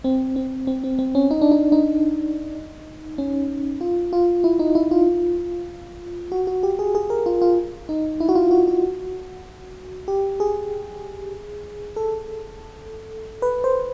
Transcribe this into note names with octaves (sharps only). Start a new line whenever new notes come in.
C4
C4
C4
C4
C4
C#4
D#4
D4
D#4
D#4
C#4
F4
F4
E4
D#4
E4
F4
F#4
F#4
G4
G#4
G#4
A#4
F4
F4
D#4
E4
F#4
F4
F#4
F#4
G4
G#4
A4
B4
C5